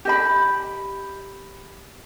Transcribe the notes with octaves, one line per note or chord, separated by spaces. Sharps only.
G4 D#5 B5